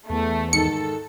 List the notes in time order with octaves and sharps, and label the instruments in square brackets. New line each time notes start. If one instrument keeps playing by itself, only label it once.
[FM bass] E2 [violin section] A3
[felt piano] G#2 D#3 [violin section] A4 [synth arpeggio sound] C#7